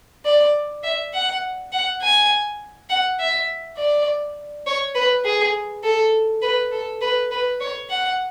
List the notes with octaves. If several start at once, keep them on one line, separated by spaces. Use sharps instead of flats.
D5
E5
F#5
F#5
G#5
F#5
E5
D5
C#5
B4
G#4
A4
B4
A4
B4
B4
C#5
F#5